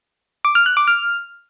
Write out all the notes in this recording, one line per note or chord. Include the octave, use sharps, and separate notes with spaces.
D6
F6
F#6
D6
F6